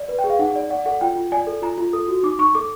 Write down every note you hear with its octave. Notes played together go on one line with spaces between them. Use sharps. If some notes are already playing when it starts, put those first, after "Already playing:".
Already playing: D5
B4
G5
G#4
F5
D#4 F#5
D5
D5 F#5
A4 F#5
F4 G5
F4
D5 G#5
A4
F4 A#5
F4
A4 D#6
F#4
D#4 D6
D#4 C#6
A4 D6